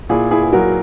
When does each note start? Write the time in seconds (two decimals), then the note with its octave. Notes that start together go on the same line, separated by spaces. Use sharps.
0.09 A#2 E4 G#4
0.31 E4 G#4
0.43 G#4
0.53 F#3 F#4 A#4